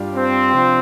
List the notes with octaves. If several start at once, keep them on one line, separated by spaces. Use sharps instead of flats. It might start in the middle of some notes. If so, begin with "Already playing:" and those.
Already playing: G2 G3 D4 F4
C4
C3 F3 D4 F4